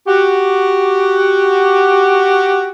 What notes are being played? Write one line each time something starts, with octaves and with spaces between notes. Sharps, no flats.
F#4 G4